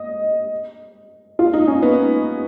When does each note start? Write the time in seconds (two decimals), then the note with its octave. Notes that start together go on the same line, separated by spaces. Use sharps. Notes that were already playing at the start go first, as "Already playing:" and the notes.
Already playing: D#5
1.39 F4
1.53 D#4
1.67 C#4
1.82 B3